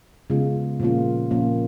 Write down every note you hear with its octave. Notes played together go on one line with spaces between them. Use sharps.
C#3 G#3 B3 F4 G#4
A#2 F3 A#3 C#4 F4
A#2 F3 A#3 C#4 F4